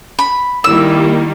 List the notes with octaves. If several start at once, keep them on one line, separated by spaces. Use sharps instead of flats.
B5
D#3 G3 A#3 E4 E6